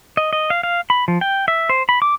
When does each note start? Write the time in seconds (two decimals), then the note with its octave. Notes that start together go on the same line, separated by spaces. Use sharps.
0.17 D#5
0.33 D#5
0.50 F5
0.63 F5
0.90 B5
1.08 F3
1.21 G5
1.48 E5
1.69 C5
1.89 B5
2.02 D6